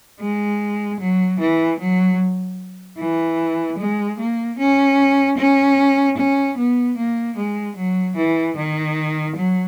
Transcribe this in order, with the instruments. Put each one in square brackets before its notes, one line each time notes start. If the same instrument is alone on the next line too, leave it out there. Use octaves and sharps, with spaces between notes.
[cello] G#3
F#3
E3
F#3
E3
G#3
A#3
C#4
C#4
C#4
B3
A#3
G#3
F#3
E3
D#3
F#3